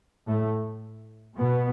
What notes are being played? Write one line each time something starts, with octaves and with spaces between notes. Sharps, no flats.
A2 A3
B2 B3